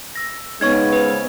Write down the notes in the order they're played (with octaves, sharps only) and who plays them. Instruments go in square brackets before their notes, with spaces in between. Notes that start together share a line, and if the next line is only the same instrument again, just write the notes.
[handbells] E6 A#6
[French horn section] C#3 G#3 B3 [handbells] D#4 C#5 C#6 [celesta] G#6
[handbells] B4 C5